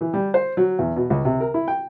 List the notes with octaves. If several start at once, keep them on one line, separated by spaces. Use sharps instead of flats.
E3
G3
C5
F#3
E2
B2
C#2
C3
A#4
E4
G5